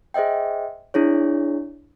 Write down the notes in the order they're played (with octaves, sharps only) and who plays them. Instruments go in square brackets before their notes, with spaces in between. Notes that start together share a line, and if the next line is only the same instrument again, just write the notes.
[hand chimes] G#4 C5 D#5 E5 G5
D4 E4 G#4 C#5